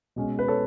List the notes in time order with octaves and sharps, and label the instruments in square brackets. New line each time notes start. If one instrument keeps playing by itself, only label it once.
[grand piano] B2 G#3 C#4
B4
A4 C#5